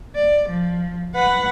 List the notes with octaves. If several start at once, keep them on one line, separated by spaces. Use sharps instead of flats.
D5
F3
B4 F#5